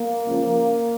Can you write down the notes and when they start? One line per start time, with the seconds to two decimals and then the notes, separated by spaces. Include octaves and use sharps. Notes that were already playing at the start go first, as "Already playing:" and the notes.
Already playing: A#3
0.27 C#2 C#3 F3